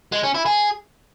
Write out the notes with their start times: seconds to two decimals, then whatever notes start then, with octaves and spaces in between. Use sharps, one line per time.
0.12 G#3
0.23 C#4
0.34 E4
0.46 G#4